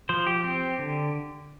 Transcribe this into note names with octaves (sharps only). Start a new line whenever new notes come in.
F3 C5
G4
C4
D3